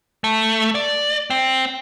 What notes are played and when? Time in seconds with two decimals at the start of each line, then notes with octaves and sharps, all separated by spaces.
0.24 A3
0.75 D5
1.30 C4